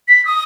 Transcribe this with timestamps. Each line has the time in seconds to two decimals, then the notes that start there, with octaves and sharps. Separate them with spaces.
0.08 B6
0.25 D#6